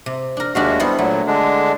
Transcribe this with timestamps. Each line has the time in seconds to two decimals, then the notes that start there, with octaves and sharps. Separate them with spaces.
0.06 C3
0.37 D4 A#4
0.55 D#2 G#3 D4 F#4 E5 F5
0.80 G3 B3 E4 A4 C5
0.99 A#2 F#3 A3
1.27 D3 G#3 D4